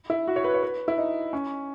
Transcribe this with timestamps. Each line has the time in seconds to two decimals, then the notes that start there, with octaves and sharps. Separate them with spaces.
0.10 E4
0.27 F#4
0.36 C#5
0.44 B4
0.54 C#5
0.63 B4
0.88 E4
0.98 D#4
1.33 C#4